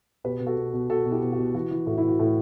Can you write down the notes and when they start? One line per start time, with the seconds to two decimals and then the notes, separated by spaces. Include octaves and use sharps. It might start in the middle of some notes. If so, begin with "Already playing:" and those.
0.24 B2 G4 B4
0.40 B2
0.47 F#4 A4
0.57 B2
0.73 B2
0.89 B2 F#4 A4
1.05 B2
1.11 E4 G4
1.22 B2
1.33 F#4
1.39 B2
1.54 E3 F#4
1.71 E3
1.87 A2 F#4
1.98 E4
2.03 E3
2.09 F#4
2.19 A2